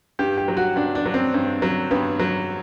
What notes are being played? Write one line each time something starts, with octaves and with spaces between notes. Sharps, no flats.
G2 G4
G4
F#3
F#4
G2 D4
D4
F#3
C4
G2
F#3
G2 B3
F#3